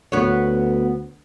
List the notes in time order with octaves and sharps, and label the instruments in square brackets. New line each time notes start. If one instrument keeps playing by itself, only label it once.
[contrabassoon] D2 [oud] B3 C#5